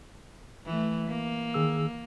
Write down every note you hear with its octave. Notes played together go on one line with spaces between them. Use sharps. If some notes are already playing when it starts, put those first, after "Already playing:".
E3 A3
A#3
D#3 G#4 E6